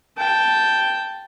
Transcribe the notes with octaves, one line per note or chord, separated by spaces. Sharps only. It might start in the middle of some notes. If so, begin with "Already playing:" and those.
G5 A5